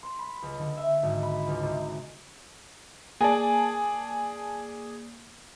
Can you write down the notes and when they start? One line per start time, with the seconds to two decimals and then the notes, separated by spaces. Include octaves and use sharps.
0.03 C6
0.19 B5
0.42 C#2
0.59 D3
0.77 E5
1.03 G#1
1.23 B5
1.47 C#2
1.63 C3
3.21 A#3 G#4 D5 G#5 A5